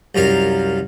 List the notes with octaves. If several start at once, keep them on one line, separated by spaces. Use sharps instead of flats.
C2 F#2 A#4 F5